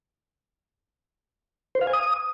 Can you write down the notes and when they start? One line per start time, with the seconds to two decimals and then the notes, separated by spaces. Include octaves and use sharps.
1.75 C5
1.81 F5
1.87 G#5
1.93 D#6